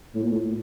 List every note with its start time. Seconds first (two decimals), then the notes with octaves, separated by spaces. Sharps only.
0.15 A2
0.23 A#2
0.32 A2